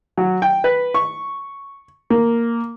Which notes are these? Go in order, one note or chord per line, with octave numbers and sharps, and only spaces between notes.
F#3
G5
B4
C#6
A#3